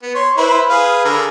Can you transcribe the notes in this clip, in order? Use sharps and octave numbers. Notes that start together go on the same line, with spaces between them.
B3
C#5 C6
E4 B4 C5
G#4 B4 F5
D3 G#4 A#4